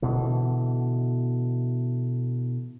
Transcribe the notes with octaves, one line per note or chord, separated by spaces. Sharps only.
B2 D3 E3